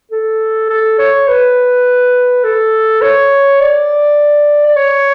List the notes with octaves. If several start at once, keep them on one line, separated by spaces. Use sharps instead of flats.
A4
A4
C#5
B4
A4
C#5
D5
D5
C#5